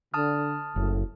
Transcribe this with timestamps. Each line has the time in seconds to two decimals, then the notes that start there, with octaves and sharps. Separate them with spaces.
0.14 D3 A5 D#6 F6
0.76 F#1 F#2 A2